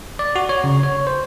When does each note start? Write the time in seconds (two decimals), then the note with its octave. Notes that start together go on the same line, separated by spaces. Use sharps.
0.19 D5
0.36 F#4
0.49 C#5
0.64 C#3
0.83 C#5
1.07 C5